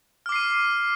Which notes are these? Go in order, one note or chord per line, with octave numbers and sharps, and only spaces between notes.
D6 F6 C7 D#7